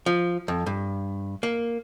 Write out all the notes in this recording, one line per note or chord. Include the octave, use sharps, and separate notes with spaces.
F3
F2
G2
A#3